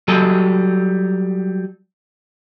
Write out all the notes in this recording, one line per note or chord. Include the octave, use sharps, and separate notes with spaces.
F#3 G3 G#4 A4